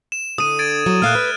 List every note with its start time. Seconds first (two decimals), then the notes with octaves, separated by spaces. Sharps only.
0.12 E7
0.38 D3 D#6 D#7
0.59 G#6 A6 D7
0.86 F#3
1.02 A#2 A3 F5 F6 F#6
1.15 B4